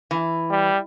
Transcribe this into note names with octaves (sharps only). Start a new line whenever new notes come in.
E3
G3